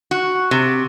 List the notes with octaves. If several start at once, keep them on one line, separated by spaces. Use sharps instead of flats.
F#4
C3